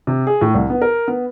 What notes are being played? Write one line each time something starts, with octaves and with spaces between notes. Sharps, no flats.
C3
G#4
A2
C2
B3
A#4
B3